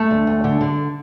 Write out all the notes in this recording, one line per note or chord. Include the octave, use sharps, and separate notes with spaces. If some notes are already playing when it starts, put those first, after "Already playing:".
Already playing: A3
D2
D2
D3
D3